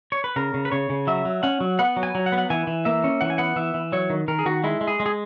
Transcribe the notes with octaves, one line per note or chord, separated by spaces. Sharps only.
C#5
B4
C#3 A#4
C#3
B4
C#3 C#5
C#3
F#3 E5
F#3
C#4 F#5
F#3
B3 F#5
F#3
G#5
F#3
F#5
B3
F#5
E3 G#5
E3
A#3 E5
C#4
E3 F#5
G#5
B3 F#5
E3 E5
E3
F#3 C#5
D#3
D#3 A#4
G#4
D#3 F#4
G#3 E4
G#3
G#4
G#3
G#4